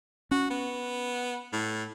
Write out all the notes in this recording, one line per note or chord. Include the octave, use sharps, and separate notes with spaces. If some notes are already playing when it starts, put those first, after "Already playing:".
C#4 F#4
B3
A2